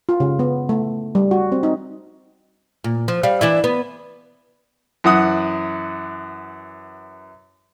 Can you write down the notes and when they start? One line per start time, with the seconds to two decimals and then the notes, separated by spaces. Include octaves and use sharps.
0.09 F4
0.20 C#3
0.39 B3
0.69 A3
1.15 G3
1.31 F#4
1.52 C4
1.63 D#4
2.84 A#2
3.08 F3
3.23 G3 F5
3.41 E3 D4 E4
3.64 B3
5.04 F#2 E3 F#5 D#6 F#6